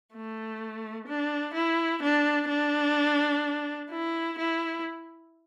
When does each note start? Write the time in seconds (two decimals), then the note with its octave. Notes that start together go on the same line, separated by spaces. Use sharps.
0.13 A3
1.08 D4
1.54 E4
2.02 D4
2.49 D4
3.91 E4
4.39 E4